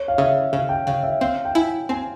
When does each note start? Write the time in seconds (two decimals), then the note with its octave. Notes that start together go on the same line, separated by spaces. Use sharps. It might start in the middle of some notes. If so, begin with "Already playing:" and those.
Already playing: C#5
0.08 F5
0.18 C#3 E5
0.53 C#3 F5
0.69 G5
0.86 C#3 F5
1.03 E5
1.21 C4 F5
1.45 G5
1.55 E4 G#5
1.89 C4 G#5